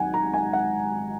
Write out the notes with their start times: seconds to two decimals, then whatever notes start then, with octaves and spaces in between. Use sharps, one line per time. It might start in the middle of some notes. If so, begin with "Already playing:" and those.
Already playing: G#1 G#2 F#3 F#5 G#5
0.14 A#5
0.34 G#5
0.53 F#5